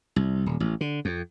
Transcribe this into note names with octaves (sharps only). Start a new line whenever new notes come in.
C2
D#1
A1
D3
F2